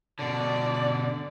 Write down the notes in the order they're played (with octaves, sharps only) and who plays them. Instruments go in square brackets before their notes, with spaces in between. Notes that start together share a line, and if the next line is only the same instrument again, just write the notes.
[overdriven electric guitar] B2 D3 [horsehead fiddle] D5